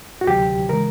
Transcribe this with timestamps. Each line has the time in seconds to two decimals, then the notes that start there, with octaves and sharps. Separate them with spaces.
0.21 F#4
0.27 D2 C3 D#3 F#3 G4
0.69 C#3 E3 G#3 A#4